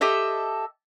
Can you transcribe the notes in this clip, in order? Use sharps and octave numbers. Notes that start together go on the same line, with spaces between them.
G4 A4 D#5 E5